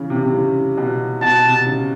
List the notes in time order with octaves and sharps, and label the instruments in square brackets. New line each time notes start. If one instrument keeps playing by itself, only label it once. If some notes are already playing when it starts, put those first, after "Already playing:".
Already playing: [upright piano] C#3 E3
C3
C3
C#3
B2
[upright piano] B2 [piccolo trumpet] A5
[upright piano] C3
C#3